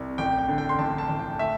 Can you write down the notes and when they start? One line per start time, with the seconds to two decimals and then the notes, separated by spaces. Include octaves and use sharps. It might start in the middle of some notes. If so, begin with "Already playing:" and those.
Already playing: C2
0.18 A1 G5
0.38 G5
0.49 D3
0.58 G5
0.69 C6
0.79 A1 A5
0.98 A5
1.09 A1
1.19 G5
1.39 A3 E5